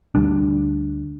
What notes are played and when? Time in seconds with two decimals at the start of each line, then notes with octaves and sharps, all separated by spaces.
0.15 D2 G3 D4